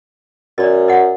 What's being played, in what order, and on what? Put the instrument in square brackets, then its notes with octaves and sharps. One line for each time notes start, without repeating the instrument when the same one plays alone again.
[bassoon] F#2 [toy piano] D5 D#5
[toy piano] D#5 F#5